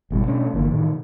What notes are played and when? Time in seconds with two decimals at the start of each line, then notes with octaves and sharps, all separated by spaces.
0.10 G#1 B2 G3
0.27 B2 A3 C#4 D4
0.54 G1 D3 E3 A#3
0.70 A2 C3 D#3 E3